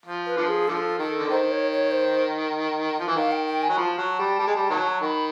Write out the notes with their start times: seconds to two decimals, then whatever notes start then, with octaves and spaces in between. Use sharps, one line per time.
0.06 F3
0.26 B4
0.37 D3 F3
0.48 G#4
0.68 D3 F3 A4
0.99 D#3 A4
1.18 D3
1.30 D#3 C5
1.51 C#5
1.72 C#5
1.91 C5
2.99 F3
3.08 E3
3.16 D#3 F5
3.32 G5
3.47 G5
3.62 G#5
3.70 F#3
3.77 F3 A5 B5
3.98 F#3
4.19 G3
4.39 G3
4.47 G#3
4.56 G3
4.70 D#3 F#3
5.01 D#3 B5 C6